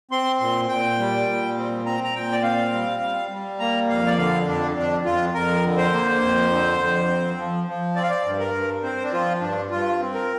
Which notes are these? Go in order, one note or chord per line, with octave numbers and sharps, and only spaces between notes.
C4 C6
A#2 C6
A#2 G5
G3
A#2
C4
C4 A#5
A#5
A#2 G5
D5
C4 F5
G3
G3
G3
A#3 A#5
F2 F5
D5
D3 F5
F2 D4
F2 D4
F2 F4
F2 A#4
D3
C5
A#3
F2
D3
F2
C4
F3
F3
C4 D5
F5
D5
G2
A#4
G2
C4 C5
D4
F3 F4
G2 D4
G2 F4
C4
A#4